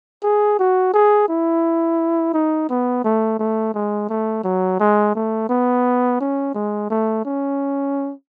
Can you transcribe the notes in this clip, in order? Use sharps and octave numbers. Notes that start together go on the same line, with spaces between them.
G#4
F#4
G#4
E4
D#4
B3
A3
A3
G#3
A3
F#3
G#3
A3
B3
C#4
G#3
A3
C#4